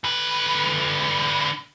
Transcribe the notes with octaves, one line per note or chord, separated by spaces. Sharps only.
D3 B4